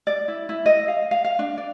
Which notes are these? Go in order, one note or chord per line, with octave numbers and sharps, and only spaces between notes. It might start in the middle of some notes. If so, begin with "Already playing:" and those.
D5
E4
E4
D#5
F5
F5
F5
D4
D5